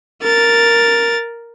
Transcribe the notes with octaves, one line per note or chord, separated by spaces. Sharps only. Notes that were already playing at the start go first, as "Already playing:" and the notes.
A#4 A6